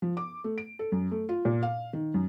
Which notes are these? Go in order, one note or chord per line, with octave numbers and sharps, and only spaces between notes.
F3
D6
A3
D7
A4
F#2
A3
F4
A#2
F5
D#3
F#2